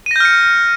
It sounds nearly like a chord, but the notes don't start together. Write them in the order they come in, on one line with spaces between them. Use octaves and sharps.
D#7 A#6 G6 F6 C#7